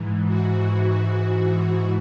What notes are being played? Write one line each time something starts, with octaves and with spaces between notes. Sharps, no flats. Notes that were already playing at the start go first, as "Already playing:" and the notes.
Already playing: G#2 E3
F#4